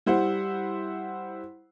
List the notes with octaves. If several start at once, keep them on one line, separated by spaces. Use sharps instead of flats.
G3 E4 C5 F#5